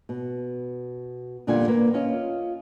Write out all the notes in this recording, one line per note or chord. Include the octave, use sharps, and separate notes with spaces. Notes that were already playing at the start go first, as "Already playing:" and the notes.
B2
E2 A#2 D3 G3 F4 G#5
A#3 B4
C#4 F4 D#5